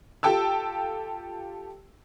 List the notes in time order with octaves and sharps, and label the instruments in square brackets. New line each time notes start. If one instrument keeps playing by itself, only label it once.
[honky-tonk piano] F4 G4 A4 G5 A5 E6